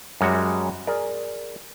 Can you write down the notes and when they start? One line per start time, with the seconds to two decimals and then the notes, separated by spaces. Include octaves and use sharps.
0.21 F#2 G3 G#3 F#4 C#5
0.87 G#4 A#4 D5